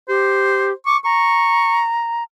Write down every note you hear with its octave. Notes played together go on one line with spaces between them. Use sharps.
G4 C5
C#6 D6
A#5 C#6